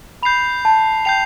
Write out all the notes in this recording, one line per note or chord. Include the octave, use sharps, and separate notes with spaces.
B5 G6 C7 F7
A5
G5 G6 C7 F7